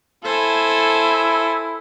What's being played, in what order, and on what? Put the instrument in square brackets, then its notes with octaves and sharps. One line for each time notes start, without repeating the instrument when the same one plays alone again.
[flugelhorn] E4 [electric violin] A4 [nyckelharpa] C5 G#5